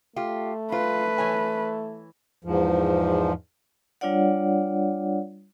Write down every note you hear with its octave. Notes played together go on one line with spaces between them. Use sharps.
A3 F4 G4
F4 B4
E3 C#5 G#5
E2 G#2 F3
G3 D4 F4 C#5 D5 F#5